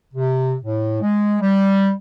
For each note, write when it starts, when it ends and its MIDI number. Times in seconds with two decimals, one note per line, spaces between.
0.14 0.54 48
0.63 0.98 45
1.01 1.36 56
1.41 1.90 55